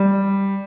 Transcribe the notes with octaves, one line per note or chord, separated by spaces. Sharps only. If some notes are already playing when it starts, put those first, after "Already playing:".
Already playing: G3